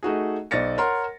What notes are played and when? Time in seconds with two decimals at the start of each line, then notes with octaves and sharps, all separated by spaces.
0.03 A3 D#4 F#4 G#4
0.51 B1 C5 D5 A6 A#6 C#7
0.78 A#4 C#5 F#5 A#5 C6